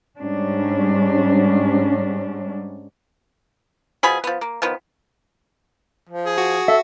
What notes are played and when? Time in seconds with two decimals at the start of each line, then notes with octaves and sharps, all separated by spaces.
0.20 G#2 G3 C#4 D4
4.03 B2 F3 G#4 B5
4.24 F3 B3
4.41 A#3
4.62 D#3 F3 B3
6.10 F3
6.26 G#4
6.38 F#4
6.68 A4 E5